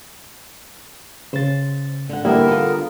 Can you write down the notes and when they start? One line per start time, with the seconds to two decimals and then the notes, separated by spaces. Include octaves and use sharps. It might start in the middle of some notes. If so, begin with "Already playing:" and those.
1.33 C#3 C5 A6
2.09 D3 F#5
2.25 D3 G3 A#3 B3 D4 E4 A#4 C5
2.48 F4 A4